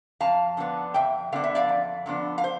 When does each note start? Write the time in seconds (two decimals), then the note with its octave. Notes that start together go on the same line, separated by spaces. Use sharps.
0.21 F2 F5 A5
0.57 D3 F3 B3 D4
0.94 F2 E5 G5
1.32 D3 F3 B3 D4 F5
1.44 E5
1.55 D5 F5
1.69 F2
2.06 D3 F3 B3 D4
2.38 F5
2.44 C5